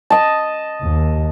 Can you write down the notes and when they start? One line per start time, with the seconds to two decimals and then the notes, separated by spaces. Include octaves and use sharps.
0.10 D#5 A5
0.82 D#2